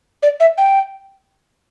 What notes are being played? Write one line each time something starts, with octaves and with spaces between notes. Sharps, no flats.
D5
E5
G5